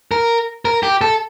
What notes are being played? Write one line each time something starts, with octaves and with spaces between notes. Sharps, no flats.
A#4
A#4
G4
A4